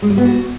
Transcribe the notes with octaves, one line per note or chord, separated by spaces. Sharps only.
G#3
G3
B3
F#4